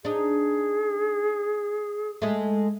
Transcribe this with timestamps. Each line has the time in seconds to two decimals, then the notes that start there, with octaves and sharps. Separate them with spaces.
0.05 D4 D#4 G#4
2.22 G#3 A3